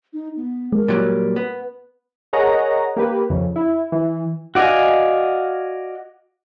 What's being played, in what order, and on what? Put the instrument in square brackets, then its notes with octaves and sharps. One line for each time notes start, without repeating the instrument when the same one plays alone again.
[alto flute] D#4
B3
[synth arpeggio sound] G#3 [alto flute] A#4
[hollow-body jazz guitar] A#2 F#3 G3
B3
[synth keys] G#4 A#4 C#5 D#5 F#5 A#5
A#3 G4 B4
F2 C#3
E4
E3
[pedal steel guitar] F#4 D5 D#5 F5 G#5